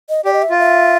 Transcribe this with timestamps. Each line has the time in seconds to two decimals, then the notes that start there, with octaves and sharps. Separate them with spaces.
0.09 D#5
0.25 G4 D5
0.33 D#5
0.42 E5
0.50 F4
0.59 E5